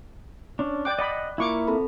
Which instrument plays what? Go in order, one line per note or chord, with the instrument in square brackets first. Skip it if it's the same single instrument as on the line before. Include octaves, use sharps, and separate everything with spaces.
[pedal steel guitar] C#4 D4
[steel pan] D5 G5 D6 [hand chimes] F#6
[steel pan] D5 B5 [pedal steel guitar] D#5 F#5
[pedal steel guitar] A#3 E4 [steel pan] F4 C#6 D6
[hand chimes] C4 A4 B5